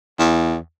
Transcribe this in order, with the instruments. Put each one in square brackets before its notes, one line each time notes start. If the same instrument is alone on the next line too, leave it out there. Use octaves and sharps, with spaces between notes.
[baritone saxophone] E2